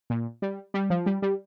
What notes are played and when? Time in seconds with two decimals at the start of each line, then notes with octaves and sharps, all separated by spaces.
0.10 A#2
0.42 G3
0.74 G3
0.90 F3
1.06 G3
1.22 G3